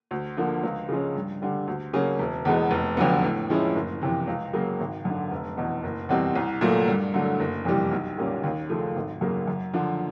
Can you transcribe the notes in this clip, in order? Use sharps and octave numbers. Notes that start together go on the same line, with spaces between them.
D2
D3 F3 A#3
C#2
C#3 F3 G#3 C#4
G2
D3 G3
D2
C#3 F#3 A#3 C#4
E1
E2 B2 G#3 B3
F1
F2 D3 F#3 B3
A2
F3 G#3 C#4 E4
F#1
F2 C3 E3
C#2
C#3 F#3 A#3
G#1
F#2 D3
F1
E2 B2
F#1
E2 B2 G3 C4
C2
A#2 F#3 A3
G2
D3 F#3 A3
F#1
F2 C3 E3 G3
B1
A#2 G3 A#3 C#4
D#2
C#3 F3 A3
G#1
F#2 C#3 F#3 A#3
F#2
D3 F3